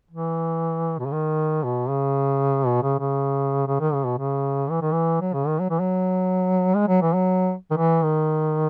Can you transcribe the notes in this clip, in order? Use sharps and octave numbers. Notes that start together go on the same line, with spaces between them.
E3
B2
C#3
D#3
B2
C#3
B2
C#3
C#3
C#3
D#3
C#3
B2
C#3
E3
D#3
E3
F#3
C#3
D#3
F#3
E3
F#3
G#3
F#3
E3
F#3
D#3
E3
D#3